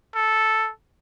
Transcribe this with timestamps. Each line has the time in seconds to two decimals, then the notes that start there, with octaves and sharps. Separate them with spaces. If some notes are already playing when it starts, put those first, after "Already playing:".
0.15 A4